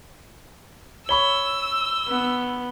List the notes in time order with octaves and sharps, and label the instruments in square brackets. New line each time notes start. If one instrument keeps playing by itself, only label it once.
[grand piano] C#5 B5 C#6 [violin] E6 [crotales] G7
[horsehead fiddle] B3